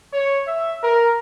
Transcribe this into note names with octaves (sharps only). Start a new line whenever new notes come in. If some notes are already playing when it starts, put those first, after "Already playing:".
C#5
E5
A#4